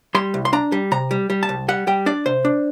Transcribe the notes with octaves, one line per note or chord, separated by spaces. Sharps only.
G3 C6
C2
C6
D4 A#5
G3
C3 A#5
G3
G3
A5
C2
G3 F#5
G3 G5
D4 D5
C3 C5
D4